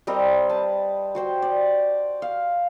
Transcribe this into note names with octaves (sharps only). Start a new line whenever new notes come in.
G3 C4 A#4 D#5
B4 A5
F#4 C5 G5
D5
F5